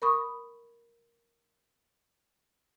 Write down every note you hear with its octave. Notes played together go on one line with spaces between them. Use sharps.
A#4 B5 C#6 D#6